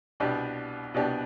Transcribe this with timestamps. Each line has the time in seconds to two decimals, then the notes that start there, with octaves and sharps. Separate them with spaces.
0.20 C2 B2 B3 D4 G4
0.94 C2 B2 B3 D4 G4